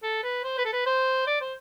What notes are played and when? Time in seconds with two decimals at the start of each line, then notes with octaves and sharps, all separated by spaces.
0.03 A4
0.24 B4
0.44 C5
0.58 B4
0.65 A4
0.72 B4
0.86 C5
1.27 D5
1.41 C5